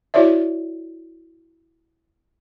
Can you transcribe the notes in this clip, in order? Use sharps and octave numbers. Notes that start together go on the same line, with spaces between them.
E4 F#4 C#5 D5 E5